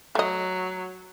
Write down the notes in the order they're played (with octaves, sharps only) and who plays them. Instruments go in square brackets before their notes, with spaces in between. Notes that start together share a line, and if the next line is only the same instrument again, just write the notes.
[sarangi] F#3 [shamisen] A3 D#5